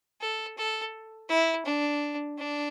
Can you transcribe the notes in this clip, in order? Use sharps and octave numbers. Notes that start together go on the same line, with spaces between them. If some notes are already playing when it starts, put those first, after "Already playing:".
A4
A4
E4
D4
D4